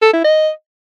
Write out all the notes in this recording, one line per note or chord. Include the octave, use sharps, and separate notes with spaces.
A4
E4
D#5